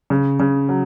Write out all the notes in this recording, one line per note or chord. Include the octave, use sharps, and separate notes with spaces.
C#3
C#3
F#3